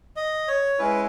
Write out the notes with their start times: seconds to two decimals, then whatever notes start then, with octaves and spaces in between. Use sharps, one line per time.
0.16 D#5
0.48 C#5
0.79 G#3 C#4 E4 B4